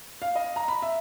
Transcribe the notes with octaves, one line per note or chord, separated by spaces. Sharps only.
F5
D#5
A#5
B5
E5